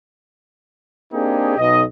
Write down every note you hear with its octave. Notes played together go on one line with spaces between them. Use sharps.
A#3 C4 D4 D#4 G4 G#4
B1 D#5